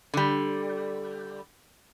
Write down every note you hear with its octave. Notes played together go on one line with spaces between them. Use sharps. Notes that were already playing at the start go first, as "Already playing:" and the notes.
D3 G3